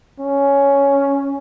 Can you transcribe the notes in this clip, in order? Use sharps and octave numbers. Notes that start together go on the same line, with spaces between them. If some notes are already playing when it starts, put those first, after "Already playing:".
C#4